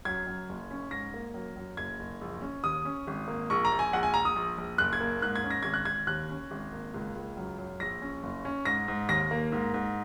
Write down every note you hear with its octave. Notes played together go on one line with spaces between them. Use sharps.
F#2 G#6
F#2
F#1
C#4
G#2 A#6
A#3
F#2
F#2
F#1 G#6
F#1
A#1
C#4
D#2 D#6
C#4
G#1
A#3
A#1 C#6
A#5
A#1
G#5
A#1 F#5
G#5
A#1 A#5
D#6
A#1
A#1
F#1 F#6
G#6
A#3
G#2 F#6
G#6
C#4
A#6
G#1 G#6
F#6
G#1 G#6
D#2 F#6
C#4
G#1
A#3
C#2
C#2
F#2
F#2
A#1 A#6
C#4
F#1
C#4
G#2 A#6
G#2
D#2 A#6
A#3
G#2
G#2